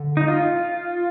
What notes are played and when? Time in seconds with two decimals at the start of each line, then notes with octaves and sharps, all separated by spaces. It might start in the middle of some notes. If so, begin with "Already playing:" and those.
Already playing: D3
0.17 D#4
0.28 F4